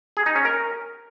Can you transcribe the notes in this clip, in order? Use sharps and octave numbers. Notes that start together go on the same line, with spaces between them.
G#4
D#4
C#4
A#4